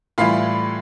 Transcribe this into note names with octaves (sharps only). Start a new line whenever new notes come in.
A2 E3 G3 F4 F5